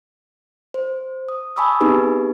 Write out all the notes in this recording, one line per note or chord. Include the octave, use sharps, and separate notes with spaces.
C5
D#6
G#5 A5 B5 C#6 D#6 E6
B3 C4 D#4 G4 G#4 B4